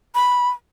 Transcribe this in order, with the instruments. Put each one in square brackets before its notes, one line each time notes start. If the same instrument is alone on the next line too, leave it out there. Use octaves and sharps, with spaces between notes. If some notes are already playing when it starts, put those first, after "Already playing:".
[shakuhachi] B5